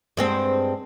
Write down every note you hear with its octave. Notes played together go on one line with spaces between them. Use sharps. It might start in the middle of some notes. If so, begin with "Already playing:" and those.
G2 G#3 C4